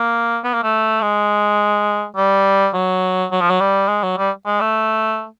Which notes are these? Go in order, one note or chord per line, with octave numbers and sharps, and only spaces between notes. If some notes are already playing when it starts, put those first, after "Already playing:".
Already playing: A#3
B3
A#3
A3
G#3
G3
F#3
F#3
F3
F#3
G3
G#3
F#3
G3
G#3
A3